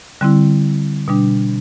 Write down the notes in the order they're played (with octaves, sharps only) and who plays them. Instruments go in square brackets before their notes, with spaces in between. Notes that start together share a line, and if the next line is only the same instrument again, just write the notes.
[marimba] D3 G3 C4 E4
B2 G3 D4